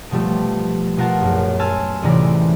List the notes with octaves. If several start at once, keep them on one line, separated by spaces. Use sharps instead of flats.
B2 F3 G3 A3
B2 F4 A#4 F#5 A5
A#1 F#2
G#5 A5 C6 E6 F6
C#2 A2 C3 E3 D5 A#5